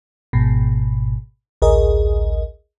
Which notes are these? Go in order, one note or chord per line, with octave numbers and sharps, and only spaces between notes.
G#1 G#2 B2
A1 D2 G#4 A#4 D#5